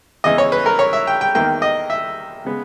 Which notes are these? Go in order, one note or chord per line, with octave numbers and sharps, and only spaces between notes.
E2 C#3 E3 D#5
C#5
B4
A#4
C#5
E5
G5
G5
E2 D#3 A#3 G5
D#5
E5
C#3 G#3 B3